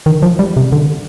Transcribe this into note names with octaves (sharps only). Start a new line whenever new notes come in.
D#3
F3
G3
C3
D3